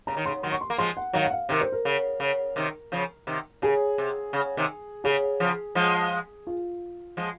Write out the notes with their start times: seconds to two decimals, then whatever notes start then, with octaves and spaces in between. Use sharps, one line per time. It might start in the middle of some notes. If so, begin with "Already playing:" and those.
0.07 C#3 A#5
0.17 D#3
0.26 C#3 C6
0.43 D#3 F#3 C6
0.52 C#6
0.61 C6
0.70 A#3
0.78 F3 G#3 C6
0.97 F#5
1.13 D#3 F#3 F5
1.25 F#5
1.31 F5
1.49 C3 D#3 A#4
1.61 C5
1.72 A#4
1.85 C#3
2.20 C#3
2.56 C3 D#3
2.92 C#3 F3
3.27 C3 D#3
3.62 C#3 G#4
3.98 C3
4.33 C#3
4.57 C3 D#3
5.04 C#3 G#4
5.40 C#3 F3
5.75 F3 G#3
6.47 F4
7.17 F3 G#3